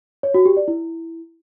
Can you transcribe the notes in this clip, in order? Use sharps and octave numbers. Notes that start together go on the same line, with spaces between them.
C#5
F#4
G4
D5
E4